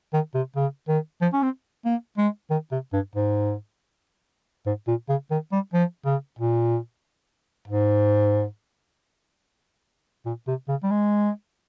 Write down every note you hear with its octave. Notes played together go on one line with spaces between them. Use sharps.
D#3
C3
C#3
D#3
F3
C#4
C4
A#3
G#3
D#3
C3
G2
G#2
G#2
A#2
C#3
D#3
G3
F3
C#3
A#2
G#2
A#2
C3
C#3
G3
G#3